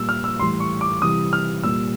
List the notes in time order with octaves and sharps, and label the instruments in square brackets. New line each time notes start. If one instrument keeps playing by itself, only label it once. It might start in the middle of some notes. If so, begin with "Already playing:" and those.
Already playing: [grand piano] A#2 G3 E6
F6
E6
A2 E3 G3 C6
C#6
D6
C3 E3 G3 D#6
F6
A#2 G3 E6